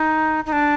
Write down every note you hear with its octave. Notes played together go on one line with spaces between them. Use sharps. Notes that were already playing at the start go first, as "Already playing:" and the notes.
Already playing: D#4
D#4
D4